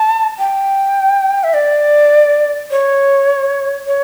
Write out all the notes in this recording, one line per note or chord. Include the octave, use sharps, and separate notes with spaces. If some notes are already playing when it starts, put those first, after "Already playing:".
Already playing: A5
G5
E5
D5
C#5
C#5